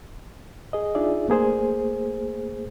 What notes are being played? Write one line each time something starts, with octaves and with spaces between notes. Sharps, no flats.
G#4 D#5
D4 D#4 F4 G#4 D5 E5
A3 A#3 G#4 C5